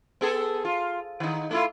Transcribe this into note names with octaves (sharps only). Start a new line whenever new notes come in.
B3 G#4 A4
F4
D#3 D#4
A3 E4 F4